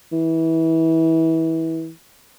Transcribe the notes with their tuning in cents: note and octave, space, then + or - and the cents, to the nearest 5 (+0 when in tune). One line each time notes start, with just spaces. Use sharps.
E3 -25